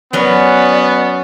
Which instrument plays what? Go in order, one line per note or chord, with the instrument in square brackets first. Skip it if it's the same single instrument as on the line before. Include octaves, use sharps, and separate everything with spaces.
[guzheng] F#3 C#4 B4 [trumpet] B3 [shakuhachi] D5